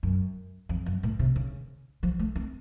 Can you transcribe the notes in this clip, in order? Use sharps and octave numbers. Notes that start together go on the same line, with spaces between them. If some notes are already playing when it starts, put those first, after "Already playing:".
F#2
F2
F#2
A2
C3
C#3
F3
A3
C4